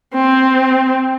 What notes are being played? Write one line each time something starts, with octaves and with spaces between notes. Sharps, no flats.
C4